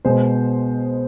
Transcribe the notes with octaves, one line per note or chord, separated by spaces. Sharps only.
B2 G#3 B3 C5